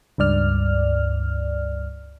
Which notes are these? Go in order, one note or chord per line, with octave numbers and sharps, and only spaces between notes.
C#2 G2 D5 F6